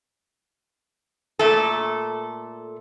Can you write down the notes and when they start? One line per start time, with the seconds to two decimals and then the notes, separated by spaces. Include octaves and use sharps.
1.39 A#2 A3 A4